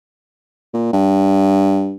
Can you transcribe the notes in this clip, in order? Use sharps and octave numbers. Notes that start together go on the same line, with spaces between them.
A#2
G2